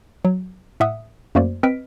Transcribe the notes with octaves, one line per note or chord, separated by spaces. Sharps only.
F#3
A2 E5 F#5 D#6
F#2 A3 A#3 F#4 C5 D5
C4 B4 D#5 F6 B6 D7